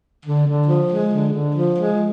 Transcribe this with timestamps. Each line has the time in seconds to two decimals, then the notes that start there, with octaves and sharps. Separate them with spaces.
0.25 D3
0.47 D3
0.68 F3
0.90 G#3
1.12 D3
1.34 D3
1.56 F3
1.78 G#3